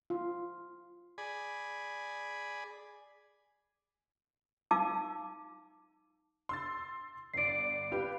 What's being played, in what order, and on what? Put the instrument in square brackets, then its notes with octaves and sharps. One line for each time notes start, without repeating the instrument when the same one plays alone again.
[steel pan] F4
[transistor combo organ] G#4 D5 G#5 B5
[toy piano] D#4 F5 A5 D6 E6
[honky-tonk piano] C6 E6 A6
[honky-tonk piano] G1 D5 [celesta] C7 D7
[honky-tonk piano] F4 G4 B4